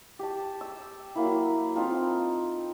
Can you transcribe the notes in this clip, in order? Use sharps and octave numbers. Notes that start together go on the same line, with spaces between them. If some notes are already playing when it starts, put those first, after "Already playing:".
G4 A5
E6
F#3 A#3 E4
C4 D#4 F4 A4